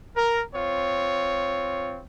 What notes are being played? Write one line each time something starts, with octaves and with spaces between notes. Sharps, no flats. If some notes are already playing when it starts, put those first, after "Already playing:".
A#4
C4 F4 C#5